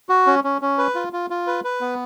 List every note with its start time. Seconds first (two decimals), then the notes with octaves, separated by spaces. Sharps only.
0.09 F#4
0.27 C#4
0.44 C#4
0.62 C#4
0.78 B4
0.95 F4
1.13 F4
1.30 F4
1.47 B4
1.64 B4
1.81 B3